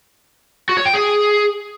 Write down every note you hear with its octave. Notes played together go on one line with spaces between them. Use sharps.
F#4
C#5
G5
G#4